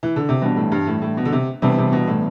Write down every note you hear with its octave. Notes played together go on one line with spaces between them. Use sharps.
E3
D3
C3
B2 E3 G3 D4
A2
G2
A2
A2
B2
D3
C3
C3 E3 G3 B3 D4
C3
B2
A2